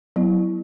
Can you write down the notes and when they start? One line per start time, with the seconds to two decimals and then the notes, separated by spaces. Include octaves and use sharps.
0.16 F#3 B3 E4